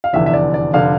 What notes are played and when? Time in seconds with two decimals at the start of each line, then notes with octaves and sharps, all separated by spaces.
0.04 F5
0.13 F1 E2 D3 E5
0.26 E5
0.33 D5
0.54 D5
0.73 F1 D3 F5